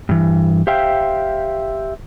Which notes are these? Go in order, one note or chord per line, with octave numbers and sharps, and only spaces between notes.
G2 E3
G4 C5 E5 F5 G5